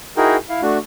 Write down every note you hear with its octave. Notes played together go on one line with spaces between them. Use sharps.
D#4 E4 F#4 G#4 A#4 G5
E4 F5
A3 D4 F#4